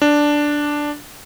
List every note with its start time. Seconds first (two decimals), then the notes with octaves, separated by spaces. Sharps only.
0.02 D4